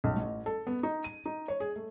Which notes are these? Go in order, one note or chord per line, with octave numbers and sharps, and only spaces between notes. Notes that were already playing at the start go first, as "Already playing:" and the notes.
B1
A1
A4
B3
D#4
D#7
D#4
C#5
G#4
A3